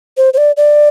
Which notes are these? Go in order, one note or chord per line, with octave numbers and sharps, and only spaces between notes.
C5
C5
D5
D5